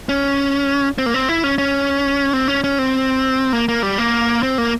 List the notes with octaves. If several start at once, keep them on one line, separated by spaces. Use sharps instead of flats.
C#4
C4
A#3
C4
E4
C#4
C#4
C4
C#4
C#4
C4
A#3
A#3
G3
A#3
C4
A#3